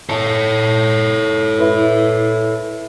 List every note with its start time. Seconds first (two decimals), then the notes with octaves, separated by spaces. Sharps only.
0.09 A4 C#5 F5 A5
1.59 E4 B4